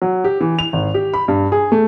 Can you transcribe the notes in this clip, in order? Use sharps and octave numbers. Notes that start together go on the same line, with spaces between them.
F#3
G4
E3
F7
G#1
G4
B5
G2
G#4
A3